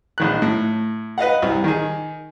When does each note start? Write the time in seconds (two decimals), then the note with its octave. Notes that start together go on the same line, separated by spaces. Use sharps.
0.18 A#1 D#3 F#6
0.42 A2
1.18 B4 D#5 F5 F#5
1.42 C2
1.64 D#3 G#4